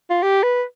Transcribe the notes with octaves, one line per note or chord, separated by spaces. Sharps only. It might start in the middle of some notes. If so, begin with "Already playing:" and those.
F4
G4
B4